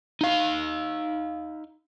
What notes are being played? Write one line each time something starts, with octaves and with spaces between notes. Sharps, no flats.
D#4 F5